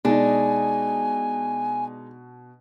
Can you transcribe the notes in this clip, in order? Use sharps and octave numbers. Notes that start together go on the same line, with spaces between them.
B2 G#3 D4 D#4 G#5